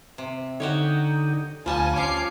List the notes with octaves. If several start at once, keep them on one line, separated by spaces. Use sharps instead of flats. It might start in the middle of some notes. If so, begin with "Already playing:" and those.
C3
D3 D#4 F#4 G4 C#5
D2 F3 G3 F4 F5 G#5 A5
F3 C#4 C#5 D6 C7